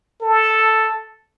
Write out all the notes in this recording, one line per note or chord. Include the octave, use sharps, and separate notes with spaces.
A4